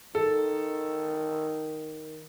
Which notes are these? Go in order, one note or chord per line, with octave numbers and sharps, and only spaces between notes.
D#3 A4